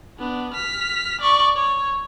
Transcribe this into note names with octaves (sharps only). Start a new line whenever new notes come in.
B3 D4
F6 B6
D5 C#6
C#5